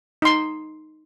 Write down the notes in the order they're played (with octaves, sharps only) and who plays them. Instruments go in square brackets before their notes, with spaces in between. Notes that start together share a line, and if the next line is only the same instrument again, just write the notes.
[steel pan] D#4 C6